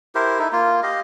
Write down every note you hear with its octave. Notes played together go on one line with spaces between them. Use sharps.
E4 G4 A#4 C5
D#4 E4 A4
A#3 F4
G4 D#5 F5